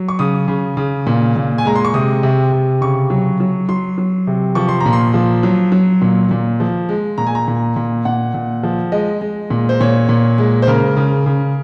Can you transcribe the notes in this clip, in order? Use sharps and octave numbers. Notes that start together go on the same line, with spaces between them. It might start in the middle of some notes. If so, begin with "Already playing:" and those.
Already playing: F#3
C#6
C#3 D#6
C#3
C#3
A#2
A#2
G#5
G#3 A#5
C6
C#6
C3 D#6
C3
C3
C#3 C#6
F#3
F#3
F#3 C6
F#3
C3
F3 C#6
C6
A#5
A#2
C6
F3
F#3
F#3
A#2
A#2
F3
G#3
A#2 A#5
G#5
A#5
A#2
A#2
A#2 F#5
A#2
F3
G#3 D#5
G#3
A#2
C5
A#2 C#5
A#2
G#3
C5
C#3 A#4
C#3
C#3